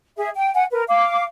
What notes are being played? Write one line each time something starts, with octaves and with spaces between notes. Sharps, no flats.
G#4 E5
G5
F#5 G#5
A#4 B4
F5 D6